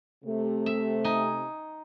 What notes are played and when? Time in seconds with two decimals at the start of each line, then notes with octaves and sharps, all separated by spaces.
0.25 C3 A3
0.66 E5
1.04 D#4 G#5